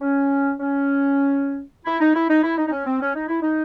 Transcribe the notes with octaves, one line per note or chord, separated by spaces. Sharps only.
C#4
C#4
E4
D#4
E4
D#4
E4
D#4
D#4
C#4
C4
C#4
D#4
E4
D#4